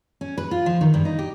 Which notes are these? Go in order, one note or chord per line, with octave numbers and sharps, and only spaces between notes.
C#4
B4
F4
F3
D#3
G2
D#4
G4